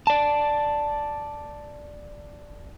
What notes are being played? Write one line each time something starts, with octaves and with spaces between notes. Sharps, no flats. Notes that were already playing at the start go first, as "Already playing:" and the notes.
D5 A5